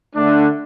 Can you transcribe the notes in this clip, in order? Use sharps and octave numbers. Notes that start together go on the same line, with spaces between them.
D3 A3 D4